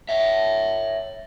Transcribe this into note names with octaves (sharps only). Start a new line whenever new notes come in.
C#5 E5